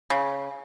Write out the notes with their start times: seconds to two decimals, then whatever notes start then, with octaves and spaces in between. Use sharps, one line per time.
0.10 C#3